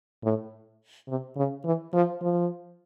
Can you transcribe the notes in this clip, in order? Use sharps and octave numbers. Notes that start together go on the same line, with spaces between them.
A2
C3
C#3
E3
F3
F3